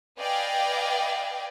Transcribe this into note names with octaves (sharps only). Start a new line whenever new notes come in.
B4 D5 D#5 F5 G5 G#5